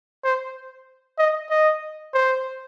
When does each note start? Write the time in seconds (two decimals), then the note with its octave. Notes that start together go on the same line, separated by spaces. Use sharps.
0.24 C5
1.18 D#5
1.50 D#5
2.14 C5